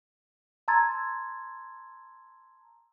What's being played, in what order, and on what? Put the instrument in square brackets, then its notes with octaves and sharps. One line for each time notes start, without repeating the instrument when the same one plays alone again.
[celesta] A5 A#5 C6 E6 G#6 A6